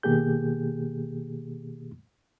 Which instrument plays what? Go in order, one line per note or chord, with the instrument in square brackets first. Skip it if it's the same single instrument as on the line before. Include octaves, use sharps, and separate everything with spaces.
[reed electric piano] B2 D#3 A#3 G4 G#4 G6